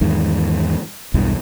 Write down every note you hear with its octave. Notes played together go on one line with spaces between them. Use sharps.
E2 G#2 D#3
B1 E2 G2 E3